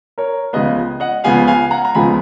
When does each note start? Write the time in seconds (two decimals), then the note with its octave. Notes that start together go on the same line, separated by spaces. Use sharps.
0.18 A#4 C#5
0.53 C#2 C#3 F3 G#3 B3 B4 D#5
1.00 D#5 F#5
1.24 C#2 C#3 F3 G#3 B3 F5 G#5
1.47 F5 G#5
1.71 F#5 A#5
1.85 A#5
1.95 C#2 C#3 F3 G#3 B3 G#5 B5